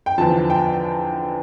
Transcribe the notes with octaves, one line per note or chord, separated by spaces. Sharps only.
G5
E2 D3 F3 A5
G5